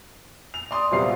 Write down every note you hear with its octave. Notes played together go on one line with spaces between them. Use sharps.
F7
D5 C6 D#6
D#1 C3 F#3 B3 F4 C7